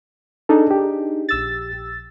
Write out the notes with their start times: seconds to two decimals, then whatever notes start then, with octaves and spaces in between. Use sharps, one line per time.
0.49 D4 D#4 G#4 A4
0.71 G4
1.29 A#1 E6 A6